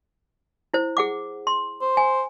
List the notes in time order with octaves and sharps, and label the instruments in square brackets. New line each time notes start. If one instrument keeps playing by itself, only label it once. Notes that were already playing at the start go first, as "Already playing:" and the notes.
[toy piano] E4 C5
G#4 F#5 D6
C6
[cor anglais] C5
[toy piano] G#5